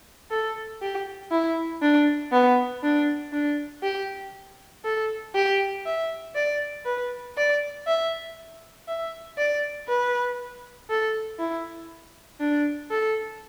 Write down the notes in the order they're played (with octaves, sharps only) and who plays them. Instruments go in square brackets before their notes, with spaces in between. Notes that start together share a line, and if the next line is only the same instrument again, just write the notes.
[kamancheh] A4
G4
E4
D4
B3
D4
D4
G4
A4
G4
E5
D5
B4
D5
E5
E5
D5
B4
A4
E4
D4
A4